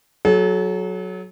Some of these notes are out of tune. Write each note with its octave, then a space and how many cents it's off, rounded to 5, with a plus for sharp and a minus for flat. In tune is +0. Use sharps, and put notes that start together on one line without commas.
F#3 +0 A4 -45